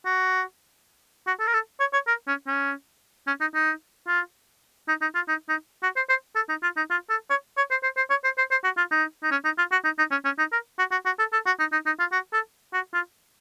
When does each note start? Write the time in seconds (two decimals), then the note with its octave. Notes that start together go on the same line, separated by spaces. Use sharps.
0.05 F#4
1.27 F#4
1.40 A4
1.47 A#4
1.54 A4
1.80 C#5
1.93 C#5
2.07 A#4
2.28 C#4
2.47 C#4
3.27 C#4
3.41 D#4
3.55 D#4
4.07 F4
4.88 D#4
5.02 D#4
5.15 F4
5.28 D#4
5.49 D#4
5.83 F#4
5.96 C5
6.09 C5
6.35 A4
6.49 D#4
6.63 F4
6.77 D#4
6.90 F4
7.10 A4
7.30 C#5
7.57 C#5
7.71 C5
7.83 C5
7.97 C5
8.10 C#5
8.24 C5
8.38 C5
8.51 C5
8.64 F#4
8.77 F4
8.91 D#4
9.23 D#4
9.31 C#4
9.45 D#4
9.58 F4
9.72 F#4
9.84 D#4
9.98 D#4
10.11 C#4
10.25 C#4
10.38 D#4
10.52 A#4
10.79 F#4
10.92 F#4
11.05 F#4
11.19 A4
11.33 A4
11.46 F#4
11.59 D#4
11.72 D#4
11.86 D#4
11.99 F4
12.12 F#4
12.33 A4
12.73 F#4
12.93 F4